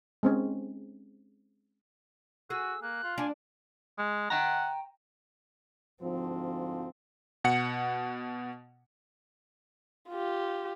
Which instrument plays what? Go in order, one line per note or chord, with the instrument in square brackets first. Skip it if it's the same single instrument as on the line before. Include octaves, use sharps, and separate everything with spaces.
[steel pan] G#3 C4 C#4
[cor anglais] F#4 [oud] G#4 [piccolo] E6
[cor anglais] A#3 [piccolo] F#6
[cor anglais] F4
[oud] D4 [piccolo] G#5
[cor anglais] G#3
[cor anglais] F#5 [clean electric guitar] G5 A#5
[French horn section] D2 G#2 F3 [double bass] C4
[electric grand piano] B2 F#5 C#7
[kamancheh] F4 G4